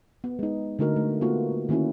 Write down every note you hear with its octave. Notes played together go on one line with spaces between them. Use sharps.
B3
G#3 D#4
D3 A3 D#4 F#4 A#4
A3
A#3 B3 F4 F#4
D#3 A#3 C#4 E4 F#4